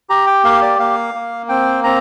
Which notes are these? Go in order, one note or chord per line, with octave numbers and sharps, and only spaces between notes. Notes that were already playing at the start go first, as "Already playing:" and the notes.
G4 A#5
G5
A#3 F5
D5
A#3 F5
A#3
C4 G5
C4 A#5